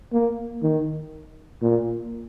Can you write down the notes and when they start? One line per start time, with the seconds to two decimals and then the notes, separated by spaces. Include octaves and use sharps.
0.13 A#3
0.63 D#3
1.62 A#2